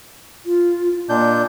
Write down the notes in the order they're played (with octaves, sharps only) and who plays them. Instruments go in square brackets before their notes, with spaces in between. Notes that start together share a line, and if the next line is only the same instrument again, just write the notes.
[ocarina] F4
[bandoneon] A#2 D4 G6 [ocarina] D#5